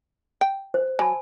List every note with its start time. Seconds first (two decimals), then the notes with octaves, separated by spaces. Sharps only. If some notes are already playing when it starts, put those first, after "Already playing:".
0.41 G5
0.74 C5
0.99 F#3 G#5 A5 B5